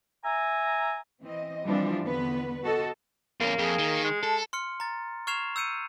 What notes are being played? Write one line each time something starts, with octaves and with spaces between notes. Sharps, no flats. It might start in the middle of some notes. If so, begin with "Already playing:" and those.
E5 G#5 A#5
E3 C4 D#5
E3 F3 G3 C4 D4
E2 D3 B3 B4
F#4 A4 D#5
E2 A#3 C#4
F2 G#4
D#3
G#3
A4 A5
C6 F6 C#7
A#5 A6
C#6 F6 G#6 C7 E7 F7
E6 G6 C#7 D#7